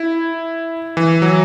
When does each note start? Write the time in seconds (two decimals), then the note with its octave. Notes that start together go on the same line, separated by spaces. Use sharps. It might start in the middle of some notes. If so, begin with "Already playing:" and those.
Already playing: E4
0.97 E3
1.22 F#3